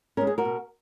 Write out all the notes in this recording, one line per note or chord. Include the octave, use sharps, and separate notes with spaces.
G#3 C#4 A#4
G#4
F#4 A#4
B2